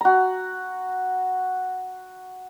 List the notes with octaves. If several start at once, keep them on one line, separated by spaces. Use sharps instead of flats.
F#4 A#5